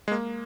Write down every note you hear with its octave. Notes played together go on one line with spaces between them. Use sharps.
G#3
A#3